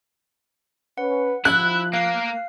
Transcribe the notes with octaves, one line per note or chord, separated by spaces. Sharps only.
C#4 B4 F#5
F3 E4 F#6
A#3 F5 C7